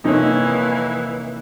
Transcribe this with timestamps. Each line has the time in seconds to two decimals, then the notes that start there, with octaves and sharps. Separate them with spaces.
0.04 F2 C3 E3 A#3 D#4 C#5